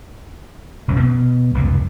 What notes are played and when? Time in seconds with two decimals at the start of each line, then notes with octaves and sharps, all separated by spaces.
0.88 E1 C#2 G2 C#4
1.00 B2
1.54 F1 C#2 G2 A#2